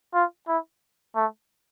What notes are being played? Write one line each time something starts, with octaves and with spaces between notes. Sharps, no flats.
F4
E4
A3